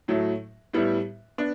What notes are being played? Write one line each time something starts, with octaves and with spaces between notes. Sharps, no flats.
A2 F#3 A3
A2 G3 B3 E4
B3 D4